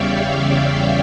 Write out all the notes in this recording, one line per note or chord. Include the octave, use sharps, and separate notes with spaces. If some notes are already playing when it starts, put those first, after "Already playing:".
Already playing: E2 C#3 G3 C#5 D5 E5 F5 G5
C#5 E5
E5 G5